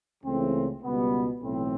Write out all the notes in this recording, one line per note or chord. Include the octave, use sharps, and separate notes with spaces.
C#2 C#3 E3 A3 C4
C#2 B2 G3 B3
B1 A2 E3 A3 C4